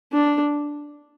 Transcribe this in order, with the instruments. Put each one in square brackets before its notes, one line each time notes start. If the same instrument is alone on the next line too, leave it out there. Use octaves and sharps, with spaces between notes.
[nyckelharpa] D4